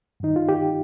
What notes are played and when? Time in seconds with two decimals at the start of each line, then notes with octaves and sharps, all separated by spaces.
0.20 G2 D#3 D#4
0.36 F4
0.49 G4